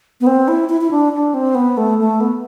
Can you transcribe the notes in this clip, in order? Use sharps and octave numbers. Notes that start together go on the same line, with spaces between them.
B3
C4
E4
E4
E4
D4
D4
C4
B3
A3
A3
B3